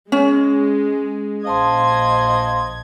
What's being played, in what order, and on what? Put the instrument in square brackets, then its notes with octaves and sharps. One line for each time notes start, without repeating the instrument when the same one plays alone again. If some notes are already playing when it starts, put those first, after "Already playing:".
[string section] G#3 [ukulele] C#4
[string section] A#1 G#6 [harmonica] C5 D#5 D#6 [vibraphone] F5 A5 C6